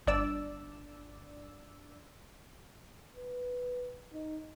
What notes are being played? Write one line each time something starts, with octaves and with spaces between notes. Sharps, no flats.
G1 D4 D5 E6
B4
D#4